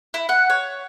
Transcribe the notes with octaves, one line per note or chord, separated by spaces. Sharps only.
E4
F#5
C#5